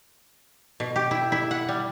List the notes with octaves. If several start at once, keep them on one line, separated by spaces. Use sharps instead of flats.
B2
G4
E4
E4
F#5
G3